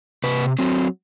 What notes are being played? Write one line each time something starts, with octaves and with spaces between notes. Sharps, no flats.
C3 B4
F#3 C4